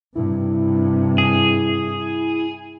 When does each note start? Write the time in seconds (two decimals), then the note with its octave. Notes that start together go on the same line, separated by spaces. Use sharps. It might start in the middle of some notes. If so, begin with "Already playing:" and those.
0.15 G2 C3 E4
1.18 G#4